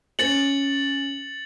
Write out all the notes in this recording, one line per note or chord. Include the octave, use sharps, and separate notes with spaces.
C#4 A6 C#7 F#7